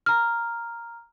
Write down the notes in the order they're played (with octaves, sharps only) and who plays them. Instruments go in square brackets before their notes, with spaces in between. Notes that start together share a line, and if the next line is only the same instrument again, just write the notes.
[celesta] A#5 F6